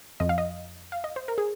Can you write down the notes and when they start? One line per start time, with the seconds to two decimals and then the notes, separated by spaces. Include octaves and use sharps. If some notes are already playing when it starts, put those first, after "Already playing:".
0.20 F2 F3 D#5
0.29 F5
0.38 D#5
0.92 F5
1.04 D#5
1.16 C5
1.28 A#4
1.38 G#4